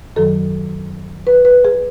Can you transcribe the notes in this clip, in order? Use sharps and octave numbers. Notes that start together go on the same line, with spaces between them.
F#2 D#3 F#3 A4
B4
B4
G#4